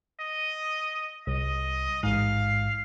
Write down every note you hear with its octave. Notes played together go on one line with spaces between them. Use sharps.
D#5
C2 D#5
A1 G#2 F5